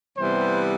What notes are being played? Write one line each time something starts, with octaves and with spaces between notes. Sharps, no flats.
C3 E3 G3 B3 C5